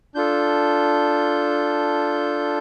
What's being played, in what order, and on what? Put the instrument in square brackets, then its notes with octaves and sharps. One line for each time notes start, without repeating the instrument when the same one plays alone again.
[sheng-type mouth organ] D4 F4 A4 G6